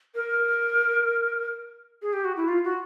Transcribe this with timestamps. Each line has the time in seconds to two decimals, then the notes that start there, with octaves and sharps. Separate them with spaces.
0.15 A#4
2.02 G#4
2.13 G4
2.25 F#4
2.37 E4
2.48 F4
2.64 F#4